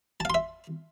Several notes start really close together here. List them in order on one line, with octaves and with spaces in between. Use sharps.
A5 F5 C6 E5